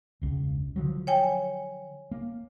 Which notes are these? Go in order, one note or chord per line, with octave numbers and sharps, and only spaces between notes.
E1 C#2
D3 F3 F#3
C#5 G5 G#5
A#3